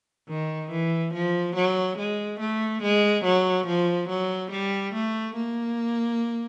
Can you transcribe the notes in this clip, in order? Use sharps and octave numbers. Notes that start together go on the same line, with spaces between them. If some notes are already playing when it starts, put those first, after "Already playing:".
D#3
E3
F3
F#3
G#3
A3
G#3
F#3
F3
F#3
G3
A3
A#3